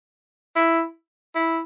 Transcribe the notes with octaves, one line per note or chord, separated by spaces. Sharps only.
E4
E4